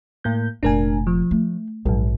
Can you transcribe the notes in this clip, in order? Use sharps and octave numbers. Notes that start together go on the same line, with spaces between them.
A2 A#3 G6
F1 A#2 D4 A#4 G#5
F3
A3
A#1 G#2 F#3